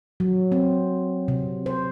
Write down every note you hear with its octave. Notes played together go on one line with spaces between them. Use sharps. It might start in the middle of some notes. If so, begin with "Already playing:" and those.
F#3
C4
C3
C5